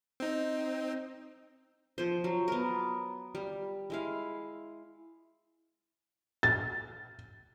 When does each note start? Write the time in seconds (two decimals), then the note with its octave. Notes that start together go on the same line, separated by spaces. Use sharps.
0.20 C4 D#4
1.98 F3 C5
2.24 F#3
2.48 B3 A#4
3.35 G3
3.90 G#3 E4 F5
6.43 A6